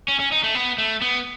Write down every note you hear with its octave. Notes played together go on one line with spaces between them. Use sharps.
C#4
C#4
D#4
A3
B3
A3
B3